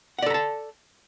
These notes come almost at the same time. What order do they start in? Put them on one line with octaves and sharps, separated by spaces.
F#5 D5 A4 A#5 A5